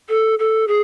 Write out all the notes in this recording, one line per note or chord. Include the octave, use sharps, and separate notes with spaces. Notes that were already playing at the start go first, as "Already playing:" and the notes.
A4
A4
G#4